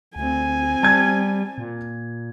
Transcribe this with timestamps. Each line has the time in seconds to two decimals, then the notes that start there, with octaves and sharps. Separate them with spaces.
0.16 D2 C4 G#5
0.83 G3 A5 G#6
1.58 A#2